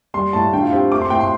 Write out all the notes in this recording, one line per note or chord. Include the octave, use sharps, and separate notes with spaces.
G3 C6
A2 A5
D3 G5
F4
C4 G4
A3 D6
C6
A2 G5
C6